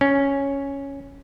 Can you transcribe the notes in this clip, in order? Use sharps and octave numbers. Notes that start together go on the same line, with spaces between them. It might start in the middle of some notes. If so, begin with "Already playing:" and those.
C#4